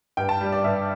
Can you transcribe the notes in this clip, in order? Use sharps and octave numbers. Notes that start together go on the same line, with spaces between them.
G2 G5
A5
G3
D5
G2 E5